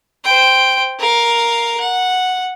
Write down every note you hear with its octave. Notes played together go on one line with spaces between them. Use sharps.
C5 G5
A#4 F5
F#5